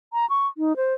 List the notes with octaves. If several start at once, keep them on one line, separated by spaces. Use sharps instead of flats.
A#5
C#6
D#4
C5